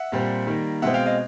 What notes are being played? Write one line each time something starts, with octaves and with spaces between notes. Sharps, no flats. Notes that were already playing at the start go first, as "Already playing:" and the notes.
Already playing: E5 F#5
A#2 G3 C4
D#3 G3 A#3
B2 G#3 C4 E5 F#5
F5 G5
D#5 F5